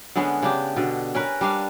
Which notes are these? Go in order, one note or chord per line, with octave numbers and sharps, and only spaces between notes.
D3 G#3 B3 C#4
C#3 D4 G4
B2 D3
C#4 A#4 B4
G3 D4 F5